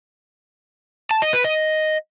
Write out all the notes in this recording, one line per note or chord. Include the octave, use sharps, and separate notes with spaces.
A5
D#5
B4
D#5